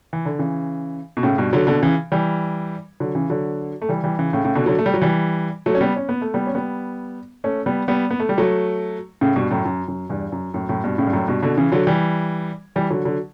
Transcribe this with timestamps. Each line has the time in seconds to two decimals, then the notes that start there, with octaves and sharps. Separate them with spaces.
0.13 E3
0.25 D3
0.39 C#3 E3
1.17 B2
1.23 A2 C#3
1.38 G2 B2
1.53 D3 F#3
1.67 B2 D3
1.82 C#3 E3
2.12 E3 G3
3.00 D3 F#3
3.15 C#3 E3
3.30 D3 F#3
3.82 A3
3.89 E3 G3
4.04 E3 G3
4.19 C#3 E3
4.33 A2 C#3
4.45 A2 C#3
4.55 B2 D3
4.66 D3 F#3
4.78 A3
4.86 G3
4.94 F#3
5.02 E3 G3
5.66 F#3 A3
5.75 C#4
5.81 G3 B3
5.96 C#4
6.09 B3
6.21 A3
6.34 G3 B3
6.47 C#4
6.55 G3 B3
7.44 A3 C#4
7.66 G3 B3
7.88 G3 B3
8.11 B3
8.20 A3
8.29 G3
8.38 F#3 A3
9.21 A2 C#3
9.36 G2 B2
9.51 F#2 A2
9.65 F#2
9.88 F#2
10.09 E2 G2
10.32 F#2
10.54 F#2 A2
10.69 F#2 A2
10.84 G2 B2
10.98 A2 C#3
11.07 G2
11.13 F#2 A2
11.28 G2 B2
11.43 B2 D3
11.57 C#3 E3
11.72 D3 F#3
11.87 E3 G3
12.76 E3 G3
12.90 D3 F#3
13.05 D3 F#3